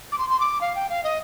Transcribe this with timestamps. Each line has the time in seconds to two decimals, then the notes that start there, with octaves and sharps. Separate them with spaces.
0.12 D6
0.18 C6
0.30 C6
0.40 D6
0.61 F5
0.75 G5
0.89 F5
1.04 D#5